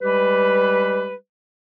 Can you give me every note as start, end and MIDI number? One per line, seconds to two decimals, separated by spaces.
0.02 1.14 55
0.02 1.14 56
0.02 1.14 67
0.02 1.14 71